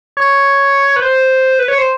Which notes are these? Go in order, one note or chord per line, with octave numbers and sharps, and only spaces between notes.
C#5
B4
C5
B4
C#5
C5